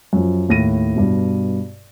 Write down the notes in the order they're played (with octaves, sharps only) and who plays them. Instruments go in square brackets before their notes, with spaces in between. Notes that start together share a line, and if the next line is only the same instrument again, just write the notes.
[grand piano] F#2 F3
D#2 A2 A#6 D#7
G2 B2